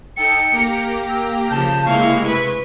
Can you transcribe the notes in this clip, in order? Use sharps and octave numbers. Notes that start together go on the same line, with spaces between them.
D#4 A4 G5 C#7
A#3 G4 A#5
E6
C#3 F3 A5 G6
C3 G#3 A#3 E4 F5 C#6
B4 B6